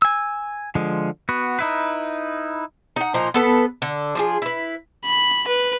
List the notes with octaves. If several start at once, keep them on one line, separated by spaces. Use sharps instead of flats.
G#5 E6
D3 F3 G#3
B3 F#4
D#4 E4 B4
D#4 F#5
A#2 F3 D#4 A#5
B3 A4 B4
D3
F3 F4 G#4
E4 B4
B5
B4